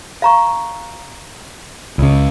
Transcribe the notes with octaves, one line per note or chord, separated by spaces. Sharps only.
F5 A#5 C#6
C#2 C#3